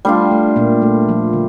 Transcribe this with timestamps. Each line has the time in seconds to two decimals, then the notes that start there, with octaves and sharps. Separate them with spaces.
0.05 G3 A3 D4 F4
0.31 A3
0.56 A#2 A#3
0.82 A3
1.09 F3
1.33 D3